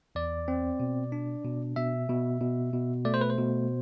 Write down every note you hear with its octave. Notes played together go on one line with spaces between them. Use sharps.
E2 D5
C4
B2
D4
B2
B2 E5
B2
B2
B2
A3 D5
C5
B4
C5
B2